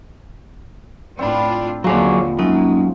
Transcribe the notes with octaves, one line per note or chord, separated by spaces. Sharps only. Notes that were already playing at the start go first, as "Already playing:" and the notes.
A2 C4 D4 F4 B5
D#2 D3 F3 F#3 G#4 C#5 C#6 D6
F#2 G#3 A#3 C#4 D#4